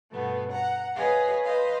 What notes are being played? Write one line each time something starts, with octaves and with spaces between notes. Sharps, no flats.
G2 B2 A3 B3
F#5 A#5
G#4 B4 C#5 D#5 F5
B4 C5 D#5 F5